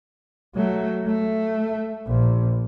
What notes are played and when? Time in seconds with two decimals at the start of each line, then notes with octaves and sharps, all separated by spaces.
0.55 F#3 A3
1.07 A3
2.07 A#1